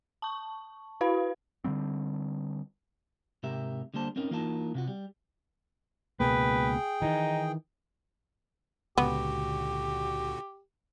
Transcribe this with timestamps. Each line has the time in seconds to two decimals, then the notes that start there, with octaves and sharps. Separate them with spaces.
0.22 A5 C#6
1.01 E4 F#4 B4 F5 B5
1.64 D3 D#3 G3 C4
3.43 G#2 C3 G4 A#4 E5
3.94 D3 G3 A#3 C5 A5
4.16 C4 C#4 D#4 A#4
4.31 E3 A#3 D#4 F4 A#4 A5
4.75 C3 F4 F#4
4.88 G3
6.20 C#2 B2 A#3 G#4 B4 G5
7.02 D#3 E3 D#4
8.98 C#2 A#2 D3 B3 F#4 G4